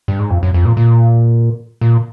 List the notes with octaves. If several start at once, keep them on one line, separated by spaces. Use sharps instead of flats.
G2
G#2
F2
F#2
F2
A#2
A#2
A#2